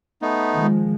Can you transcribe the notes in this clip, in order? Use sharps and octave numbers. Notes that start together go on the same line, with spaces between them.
A3 B3 D#4
D#3 F3 G#3